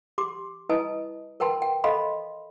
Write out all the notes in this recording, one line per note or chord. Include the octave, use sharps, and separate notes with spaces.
G4 C6 D6
E4 B4 D#5 G#5 A5 D#6
A#4 B4 G5 A5 C6
G5
A4 C5 D#5 F5 B5 C6